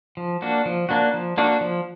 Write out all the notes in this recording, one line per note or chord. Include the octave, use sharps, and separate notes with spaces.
F3
A#3 D4 F#4
F3
A#3 D4 F#4
F3
A#3 D4 F#4
F3